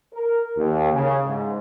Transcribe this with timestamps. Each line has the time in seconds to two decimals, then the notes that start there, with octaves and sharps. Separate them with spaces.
0.13 A#4
0.57 D#2
0.92 C#3
1.26 G#2